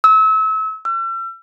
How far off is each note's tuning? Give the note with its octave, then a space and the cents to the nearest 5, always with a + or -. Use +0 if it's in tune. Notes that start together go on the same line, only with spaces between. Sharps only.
E6 -30
E6 +40